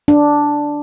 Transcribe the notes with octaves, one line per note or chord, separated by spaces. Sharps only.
D4